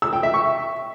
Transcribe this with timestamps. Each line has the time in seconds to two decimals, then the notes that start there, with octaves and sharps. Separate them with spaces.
0.02 E6
0.13 G5
0.23 E5
0.34 C#6